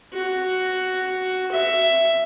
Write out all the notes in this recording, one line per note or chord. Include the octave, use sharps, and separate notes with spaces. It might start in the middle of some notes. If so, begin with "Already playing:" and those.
F#4
E5